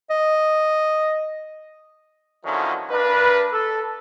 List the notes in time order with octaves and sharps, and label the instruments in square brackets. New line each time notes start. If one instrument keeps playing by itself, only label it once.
[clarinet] D#5
[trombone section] D3 D#3 F3 F#3 C#4 E4
G2 D4 A#4 B4
A4